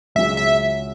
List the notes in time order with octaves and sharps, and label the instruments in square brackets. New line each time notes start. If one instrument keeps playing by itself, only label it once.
[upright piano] C#2 C#3 F#3 C#4 [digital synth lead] E5
[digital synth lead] E5